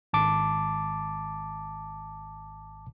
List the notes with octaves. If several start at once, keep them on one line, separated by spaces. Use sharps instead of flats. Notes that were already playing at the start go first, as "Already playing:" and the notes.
G#1 A5 D6